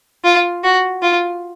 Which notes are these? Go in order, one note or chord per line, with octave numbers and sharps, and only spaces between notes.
F4
F#4
F4